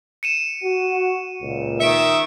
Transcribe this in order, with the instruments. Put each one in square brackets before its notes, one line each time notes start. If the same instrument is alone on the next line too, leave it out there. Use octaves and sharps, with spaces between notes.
[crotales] C#7 D#7 E7
[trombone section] F#4
C#2 A#2
[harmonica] D#3 E5 [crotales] C#7 D7